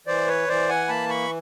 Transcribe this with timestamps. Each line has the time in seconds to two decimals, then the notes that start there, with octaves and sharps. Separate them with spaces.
0.07 E3 C5 D5
0.27 B4 C#5
0.48 E3 C5 D5
0.69 F#5 G#5
0.89 A#3 A5 B5
1.09 B5 C#6